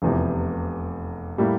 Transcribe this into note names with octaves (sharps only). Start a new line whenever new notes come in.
F1 E2 C3
A2 G3 A#3 E4